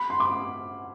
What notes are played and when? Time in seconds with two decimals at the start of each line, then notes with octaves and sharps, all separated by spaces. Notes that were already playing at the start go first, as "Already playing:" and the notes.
Already playing: B5
0.10 C6
0.20 D6